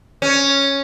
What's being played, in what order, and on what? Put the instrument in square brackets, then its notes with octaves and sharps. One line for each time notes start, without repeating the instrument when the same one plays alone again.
[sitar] C#4